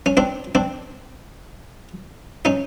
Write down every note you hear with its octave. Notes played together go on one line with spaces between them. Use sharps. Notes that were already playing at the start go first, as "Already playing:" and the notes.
C#4
C4 D4
C4 D4
C#4 D#4